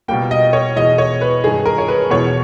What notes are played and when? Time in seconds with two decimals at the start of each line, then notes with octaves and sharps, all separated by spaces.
0.08 B2 G3 A#3 G5
0.31 D#5
0.53 C#5
0.76 E2 B2 G#3 D#5
0.98 C#5
1.21 B4
1.44 G2 D#3 G#3 G#4
1.66 A#4
1.78 C#5
1.88 B4
2.10 E2 B2 G#3 C#5